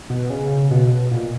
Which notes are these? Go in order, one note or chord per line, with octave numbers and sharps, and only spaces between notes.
B2
C#3
B2
A#2